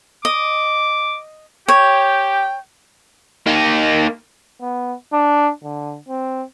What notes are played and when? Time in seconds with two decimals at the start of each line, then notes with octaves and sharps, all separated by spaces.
0.25 D#5 D6
1.68 G4 C#5 G5
3.47 A#3 D#4
4.61 B3
5.13 D4
5.63 D3
6.09 C4